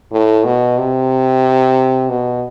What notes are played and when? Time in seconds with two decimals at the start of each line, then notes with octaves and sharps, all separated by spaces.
0.12 A2
0.45 B2
0.78 C3
2.09 B2